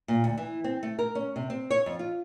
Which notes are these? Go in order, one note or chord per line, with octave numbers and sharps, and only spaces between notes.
A#2
D2
E3
C4
A3
A#4
C#4
C3
C4
C#5
F2
F4